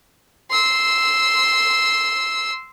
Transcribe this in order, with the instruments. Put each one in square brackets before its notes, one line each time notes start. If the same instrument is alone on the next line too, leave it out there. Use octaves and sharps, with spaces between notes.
[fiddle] C6 E6